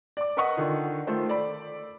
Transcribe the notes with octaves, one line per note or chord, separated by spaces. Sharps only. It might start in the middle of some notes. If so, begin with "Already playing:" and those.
D5 D6
A#4 B4 D#5 F#5 C#6 D#6
D3 D#3 F4
D#3 A3 F4 C5
A4 D5 B5